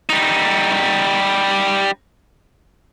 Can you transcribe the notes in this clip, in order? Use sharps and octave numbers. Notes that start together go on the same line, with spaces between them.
G3 D#4